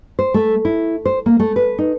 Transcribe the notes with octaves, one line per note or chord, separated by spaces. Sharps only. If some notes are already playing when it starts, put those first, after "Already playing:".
C5
A3
E4
C5
A#3
A3
B4
D#4